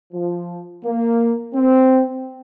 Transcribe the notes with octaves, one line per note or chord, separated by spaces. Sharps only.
F3
A#3
C4